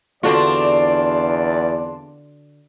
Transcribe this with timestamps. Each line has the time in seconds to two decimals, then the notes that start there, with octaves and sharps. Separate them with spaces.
0.23 E2 D3 C4 D4 F4 F#4 D5